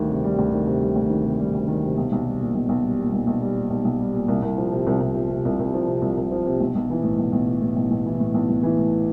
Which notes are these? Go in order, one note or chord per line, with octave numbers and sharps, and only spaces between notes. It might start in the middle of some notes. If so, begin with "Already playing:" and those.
Already playing: D2 D#3 G3
C3
G3
D2
D#3
C3
G3
D2
D#3
C3
G3
D2
D#3
C3
B1
B1
G3
A#2
B1
B1
G3
A#2
B1
B1
G3
A#2
B1
B1
G3
A#2
C2
C2
F3
C3
C2
C2
F3
C3
C2
C2
F3
C3
C2
C2
F3
C3
B1
B1
E3
A2
B1
B1
E3
A2
B1
B1
E3
A2
B1
B1
E3
A2